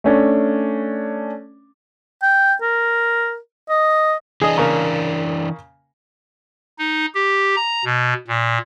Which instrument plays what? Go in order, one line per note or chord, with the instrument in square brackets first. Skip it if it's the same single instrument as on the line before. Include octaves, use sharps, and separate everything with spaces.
[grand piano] A3 C#4 D4
[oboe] G5
A#4
D#5
[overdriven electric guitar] E3 D4 [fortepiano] G#4 D#5
[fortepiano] C#3 A#3
[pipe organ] D#4
G4
A#5
B2
A#2